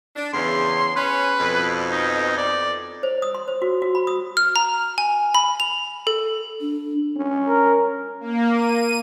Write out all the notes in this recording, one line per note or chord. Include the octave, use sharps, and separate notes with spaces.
D4
E2 C#3 C6
C#4 B4
F2 B2
D#4
D5
C5
D#6
C6
C5
F#4
F#4
B5
D#6
F6
A#5
G#5
B5
F7
A4
D4
C#4
A#4
A#3
D#7